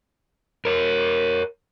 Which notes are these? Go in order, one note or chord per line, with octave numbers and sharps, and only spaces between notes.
A#4 C#5